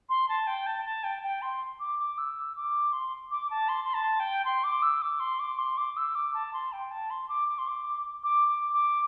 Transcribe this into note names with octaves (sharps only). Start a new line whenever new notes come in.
C6
A5
G5
A5
A5
G5
G5
C6
D6
D6
E6
D6
C6
D6
A5
C6
C6
A5
G5
C6
D6
E6
D6
C6
D6
C6
D6
E6
D6
A5
C6
G5
A5
C6
D6
D6
C6
D6
D6
D6
D6